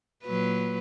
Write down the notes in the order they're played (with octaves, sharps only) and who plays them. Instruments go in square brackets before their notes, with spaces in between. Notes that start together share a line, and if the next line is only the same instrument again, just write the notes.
[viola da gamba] A#2 F#3 B4